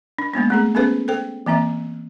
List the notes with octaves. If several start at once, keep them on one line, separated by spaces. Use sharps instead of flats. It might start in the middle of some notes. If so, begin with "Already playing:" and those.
D4
G#3 A#3 B3 D4
A3 C4 G#4
B3 C#4 G#4 A4 B4 C5
A4 C5 G5
E3 A#3 C4 E5